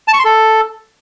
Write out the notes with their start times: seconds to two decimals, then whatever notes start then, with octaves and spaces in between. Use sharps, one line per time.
0.08 A5
0.14 C#6
0.19 C6
0.25 A4